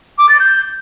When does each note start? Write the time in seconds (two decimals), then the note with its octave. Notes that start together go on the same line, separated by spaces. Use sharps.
0.18 D6
0.29 A6
0.40 G6